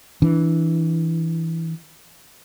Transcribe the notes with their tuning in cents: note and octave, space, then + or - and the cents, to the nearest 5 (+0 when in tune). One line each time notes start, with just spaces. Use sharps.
E3 -10 D4 +0